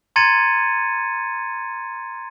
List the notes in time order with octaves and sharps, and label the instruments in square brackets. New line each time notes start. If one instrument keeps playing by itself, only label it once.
[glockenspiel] A#5 C6 G#6 A6 C#7 D#7